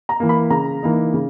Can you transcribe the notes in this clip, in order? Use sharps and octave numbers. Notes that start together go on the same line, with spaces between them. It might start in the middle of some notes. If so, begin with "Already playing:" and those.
A#5
E3 A#3
B5
C#3 A#5
E3 A#3 D#4
C#3